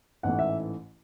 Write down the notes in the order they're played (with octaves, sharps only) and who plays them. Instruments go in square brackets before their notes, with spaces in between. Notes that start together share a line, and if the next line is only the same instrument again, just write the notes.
[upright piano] A1 G#2 E3 A3 [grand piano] F#5
[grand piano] E5